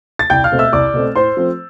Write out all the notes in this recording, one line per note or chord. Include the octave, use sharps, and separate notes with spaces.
A6
C2 G5 G6
F5 F6
B2 A3 C4
E5 E6
C2 D5 D6
B2 A3 C4
A2 C5 C6
F3 A3 C4